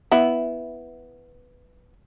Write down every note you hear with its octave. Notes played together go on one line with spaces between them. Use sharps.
B3 E4